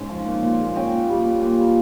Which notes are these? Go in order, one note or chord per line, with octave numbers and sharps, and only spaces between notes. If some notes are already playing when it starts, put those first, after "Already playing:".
Already playing: G#2 C#4
F3
A#2
A#2
G#3
C#4 D#5 G5
A#2
G3
A#2
A#2
G3